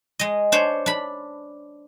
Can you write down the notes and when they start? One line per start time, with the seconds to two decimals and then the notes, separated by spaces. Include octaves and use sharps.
0.19 G#3 D#5
0.52 D4 C5 C#5
0.86 D4 B5